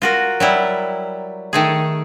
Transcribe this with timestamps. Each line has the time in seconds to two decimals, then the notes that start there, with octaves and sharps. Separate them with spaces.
0.02 F4 F#4 A#4
0.40 F#3 G3 E4
1.53 D#3 A3 G#4